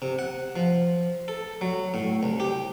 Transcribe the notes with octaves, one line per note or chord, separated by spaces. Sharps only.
C3
F#5
F3
A4
F#3
A2
C2
G4